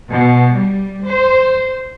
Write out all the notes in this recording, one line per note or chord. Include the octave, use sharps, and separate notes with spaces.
B2
G3
C5